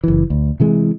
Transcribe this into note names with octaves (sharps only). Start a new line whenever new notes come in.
F#1 E3
D2
C3 E3 G#3